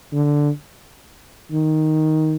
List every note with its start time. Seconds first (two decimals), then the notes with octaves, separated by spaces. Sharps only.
0.12 D3
1.52 D#3